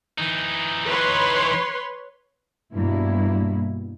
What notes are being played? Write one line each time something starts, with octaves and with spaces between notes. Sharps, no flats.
E3 D#4
B4 C#5 C6
G2 B2 A#3 E4